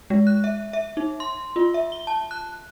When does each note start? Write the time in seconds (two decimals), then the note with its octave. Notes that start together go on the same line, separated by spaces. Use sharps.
0.10 G#3
0.27 F#6
0.44 E5
0.73 E5
0.97 D#4
1.20 C6
1.56 F4
1.74 E5
1.92 G7
2.07 A5
2.31 F#6